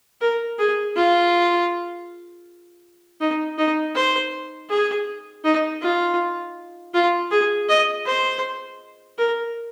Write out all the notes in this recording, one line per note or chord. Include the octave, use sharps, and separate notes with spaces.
A#4
G#4
F4
D#4
D#4
C5
G#4
D#4
F4
F4
G#4
D#5
C5
A#4